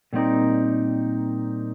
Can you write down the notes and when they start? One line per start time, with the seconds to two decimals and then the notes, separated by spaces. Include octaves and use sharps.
0.13 A#2 G3 C4 D#4 A#4